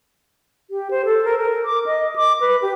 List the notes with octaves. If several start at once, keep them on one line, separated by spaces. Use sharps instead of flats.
G4
C5
A4
A#4
A#4
D6
D#5
D6
B4
G4